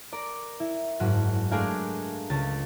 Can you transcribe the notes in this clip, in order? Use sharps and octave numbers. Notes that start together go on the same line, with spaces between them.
A#4 D5
E4
F#1 G#2 F#4
G#3 A3 D4 G#4 A#4 F5
C#2 A6